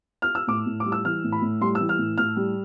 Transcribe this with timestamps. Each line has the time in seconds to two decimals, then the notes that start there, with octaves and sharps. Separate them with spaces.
0.22 F6
0.35 E6
0.47 A2 D6
0.66 A2
0.80 D6
0.86 G3
0.92 E6
1.05 E3 F6
1.24 A2
1.32 B5
1.42 A2
1.61 G3 C6
1.75 E6
1.80 E3
1.89 F6
1.98 A2
2.18 A2 F6
2.36 G3